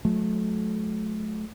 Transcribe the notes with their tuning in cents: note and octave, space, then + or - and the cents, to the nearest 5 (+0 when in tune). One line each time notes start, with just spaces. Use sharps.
F#3 -35 A3 -35